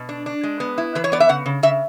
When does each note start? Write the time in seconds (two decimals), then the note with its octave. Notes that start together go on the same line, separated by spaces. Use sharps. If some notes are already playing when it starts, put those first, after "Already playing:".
Already playing: B2
0.09 D4
0.26 D4
0.43 G#3
0.60 B3
0.78 E4
0.95 E3 B4
1.04 C#5
1.12 B3 D5
1.20 E5
1.29 C#3 F#5
1.46 C#3
1.63 C#3 E5